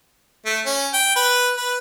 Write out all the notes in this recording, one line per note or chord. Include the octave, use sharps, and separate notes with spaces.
A3
C#4
G5
B4
B4